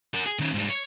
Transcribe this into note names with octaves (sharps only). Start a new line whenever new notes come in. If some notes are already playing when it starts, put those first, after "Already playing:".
F#4 A#4
G#4
D#3 C#4
G#2 G3
C#5